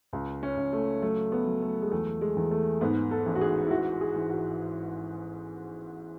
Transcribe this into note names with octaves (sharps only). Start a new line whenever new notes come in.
C#2
C#4
C#2
A3
F#3 A3
B3
F#3
A3
G#3
E2 A3
G#3
E2
A3
G#2 B3
A4
A1
F#4
G#4
E4
E3 F#4
G#4
E3
F#4